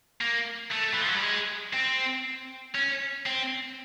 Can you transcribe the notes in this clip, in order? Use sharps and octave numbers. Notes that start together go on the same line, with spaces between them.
A#3
A3
E3
F3
F#3
G3
G#3
C4
C#4
C4